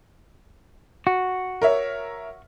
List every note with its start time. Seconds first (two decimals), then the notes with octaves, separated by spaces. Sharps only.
1.07 F#4
1.62 A#4 C#5 E5